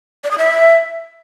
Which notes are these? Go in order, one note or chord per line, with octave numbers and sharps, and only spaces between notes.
D5
D#6
E5